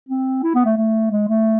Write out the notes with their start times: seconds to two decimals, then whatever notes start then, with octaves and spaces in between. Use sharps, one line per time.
0.09 C4
0.43 E4
0.55 B3
0.65 A3
0.77 A3
1.11 G#3
1.29 A3